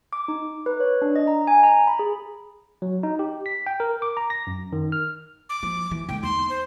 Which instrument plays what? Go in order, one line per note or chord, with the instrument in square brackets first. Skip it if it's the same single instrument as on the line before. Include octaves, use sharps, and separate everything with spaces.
[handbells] D6
D#4
B4
C#5
D4
D#5
A#5
G#5
A#5
B5
G#4
[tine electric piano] F#3
D#4
G4
B6
G5
A#4
D6
A#5
A#6
F#2
D#3
F6
[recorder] D6
[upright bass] F3
E3
[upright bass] D3 G#3 [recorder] G5
[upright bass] E2 D#4 [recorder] C6
[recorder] C5